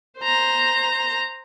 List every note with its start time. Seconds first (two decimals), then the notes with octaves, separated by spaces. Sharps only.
0.19 C5 A#5